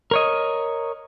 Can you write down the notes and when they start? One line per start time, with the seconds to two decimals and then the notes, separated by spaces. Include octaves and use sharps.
0.11 A#4 C#5 D#5